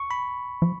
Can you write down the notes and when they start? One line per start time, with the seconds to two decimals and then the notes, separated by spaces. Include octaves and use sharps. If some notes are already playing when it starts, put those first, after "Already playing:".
Already playing: C#6
0.11 B5
0.62 F3